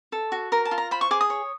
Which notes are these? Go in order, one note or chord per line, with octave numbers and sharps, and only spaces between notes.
A4
F#4
A#4 A#5
A5
F4
A#5
C5 B5
C#6
G#4 D6
D#6
C#5